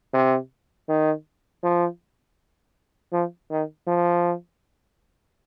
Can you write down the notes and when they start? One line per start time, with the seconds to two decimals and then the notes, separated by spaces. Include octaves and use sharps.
0.14 C3
0.89 D#3
1.63 F3
3.13 F3
3.51 D#3
3.88 F3